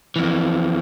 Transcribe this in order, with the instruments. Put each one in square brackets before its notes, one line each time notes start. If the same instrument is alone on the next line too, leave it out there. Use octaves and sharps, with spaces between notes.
[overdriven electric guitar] F2 E3